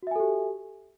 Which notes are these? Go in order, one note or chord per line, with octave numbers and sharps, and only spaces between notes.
F#4 G4 A4 E5 G#5